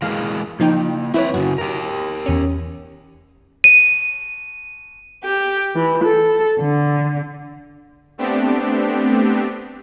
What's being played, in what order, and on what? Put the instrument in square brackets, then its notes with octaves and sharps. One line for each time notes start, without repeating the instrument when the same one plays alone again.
[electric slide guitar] E3 G#3 A#3 [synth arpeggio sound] F5
[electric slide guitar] C#3 A#3 [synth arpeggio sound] F3 D#4 G5
[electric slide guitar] F3 C4 E5 [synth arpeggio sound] E4 B4 C#5
[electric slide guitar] F#2 C#3 [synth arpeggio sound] F#4
[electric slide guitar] G4 A#4
[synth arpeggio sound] E2 C#4
[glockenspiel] D#7
[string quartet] G4
E3
A4
D3
[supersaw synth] A3 B3 C4 D4 G4